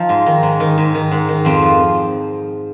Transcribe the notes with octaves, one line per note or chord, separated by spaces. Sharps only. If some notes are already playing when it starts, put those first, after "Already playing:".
Already playing: F3 D#4
G#2
D#3
G#2
D#3
G#2
D#3
G#2
D#3
F2 C4
F3